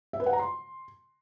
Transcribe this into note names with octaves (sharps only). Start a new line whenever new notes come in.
E5
B4
F#5
A#5
C6